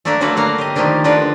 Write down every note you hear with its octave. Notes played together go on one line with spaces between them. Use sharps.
A3 A#3 D4 A#4 E5
D3 F#3 A3 A#3 F#4 B4
A#3 F5 F#5
G4 D#5
D#3 F3 A3 A#3 D4
D3 D4 F4 A#4 B4